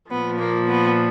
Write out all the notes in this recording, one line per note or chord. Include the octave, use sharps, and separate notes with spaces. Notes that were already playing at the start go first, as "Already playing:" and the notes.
A#2 F3 B3
A#3
B3